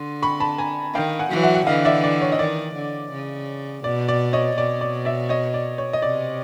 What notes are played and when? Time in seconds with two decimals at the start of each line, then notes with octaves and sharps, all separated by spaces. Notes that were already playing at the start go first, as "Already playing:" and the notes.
Already playing: D3 C6
0.23 B5 C#6
0.40 A5 B5
0.58 G#5 A#5
0.94 D#3 F5 G5
1.19 F#5 G#5
1.31 E3 F#3
1.43 E5 F#5
1.55 F#5
1.67 D3 E3 D#5 F5
1.85 D5 E5
2.04 D5
2.21 C#5
2.32 D#5
2.39 D#3 D5
2.76 D3
3.12 C#3
3.84 B2 D5
4.08 D5
4.33 C#5 D#5
4.57 B2 D5
4.81 D5
5.05 D5 E5
5.29 C#5 D#5
5.54 D5
5.78 C#5
5.93 D#5
6.02 C3 D5